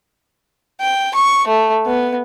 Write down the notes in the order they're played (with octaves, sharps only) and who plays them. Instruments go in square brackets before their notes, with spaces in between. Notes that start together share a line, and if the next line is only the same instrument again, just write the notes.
[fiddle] G5
C#6
A3
B3